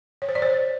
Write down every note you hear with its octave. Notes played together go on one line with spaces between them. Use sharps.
C#5
C5
D5
C5